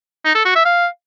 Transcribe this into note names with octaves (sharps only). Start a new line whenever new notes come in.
D#4
A4
F#4
E5
F5